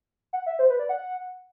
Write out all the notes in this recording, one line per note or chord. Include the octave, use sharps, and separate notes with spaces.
F#5
E5
C5
B4
D5
F#5